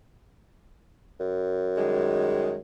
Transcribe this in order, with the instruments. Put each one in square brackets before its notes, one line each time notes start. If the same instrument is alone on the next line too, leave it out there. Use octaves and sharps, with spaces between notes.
[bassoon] F#2
[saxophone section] D#3 G3 G#3